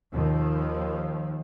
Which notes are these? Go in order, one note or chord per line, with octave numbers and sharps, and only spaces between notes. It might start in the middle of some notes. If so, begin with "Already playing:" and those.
D#2 D#3 F3